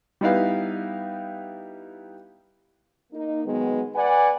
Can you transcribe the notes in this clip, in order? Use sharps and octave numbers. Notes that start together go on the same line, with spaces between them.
G3 B3 D#4 E4 B4 F5
A#3 D#4
D#3 F#3 G#3 B3
B4 D5 F#5 G#5